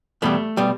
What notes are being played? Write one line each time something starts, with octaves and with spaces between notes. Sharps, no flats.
E2 B2 G3 A3
B2 G3